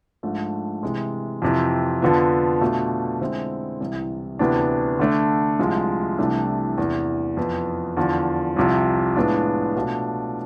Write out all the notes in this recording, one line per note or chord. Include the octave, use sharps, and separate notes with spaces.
G#2 F3 A3 D4
C3 E3 G#3
F2 C3 E3
F2 D3 F3 B3
B2 A3 D4 F4
D3 G#3 C4 E4
C2 C3 E3
D2 C3 E3 B3 D4
D3 A3 D4
C2 C3 F3 G#3
C2 C3 E3 A3 D4
E2 C3 E3
F2 E3 B3
E2 D3 F3
C2 C3 F3
A2 G#3 B3 D4 F4
B2 A3 D4 F4